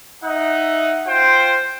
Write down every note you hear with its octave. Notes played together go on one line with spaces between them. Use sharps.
D#4 E5 F#5
F4 C5 G5